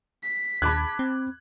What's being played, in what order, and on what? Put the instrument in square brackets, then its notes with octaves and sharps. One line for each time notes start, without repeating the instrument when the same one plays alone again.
[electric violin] B6
[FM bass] D#2 [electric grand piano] A5 F#6 [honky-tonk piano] B5 D6 G#6
[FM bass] C4